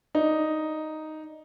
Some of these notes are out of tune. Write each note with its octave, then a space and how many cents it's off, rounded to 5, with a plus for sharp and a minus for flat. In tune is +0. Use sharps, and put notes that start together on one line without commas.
D#4 +0 D5 +5